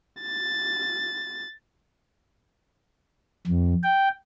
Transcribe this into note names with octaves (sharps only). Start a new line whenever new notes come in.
A6
F2
G5